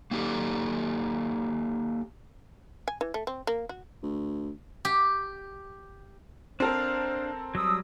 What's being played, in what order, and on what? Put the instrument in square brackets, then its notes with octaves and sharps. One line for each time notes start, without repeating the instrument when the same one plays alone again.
[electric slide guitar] A#3 D#4 F4 G4 A4
[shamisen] G#5
E3
A3
C4
A#3
F#4
[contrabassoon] D2
[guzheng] G4
[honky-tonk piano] C4 A4 A#4 [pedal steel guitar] D4 F5 [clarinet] C5
[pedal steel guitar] F#3 G3 [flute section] D#6 E6